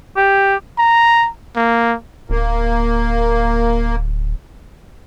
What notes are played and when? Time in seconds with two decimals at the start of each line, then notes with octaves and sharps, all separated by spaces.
0.16 G4
0.78 A#5
1.56 A#3
2.30 D1 A#3